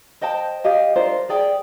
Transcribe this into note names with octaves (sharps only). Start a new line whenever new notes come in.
C5 D#5 G5 A5
G4 D#5 F5
D4 F4 A#4 C5
G#4 D5 G5